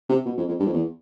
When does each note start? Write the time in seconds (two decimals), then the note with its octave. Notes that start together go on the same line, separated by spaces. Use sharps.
0.09 C3
0.26 B2
0.38 F2
0.48 F2
0.60 G2
0.66 F2
0.74 E2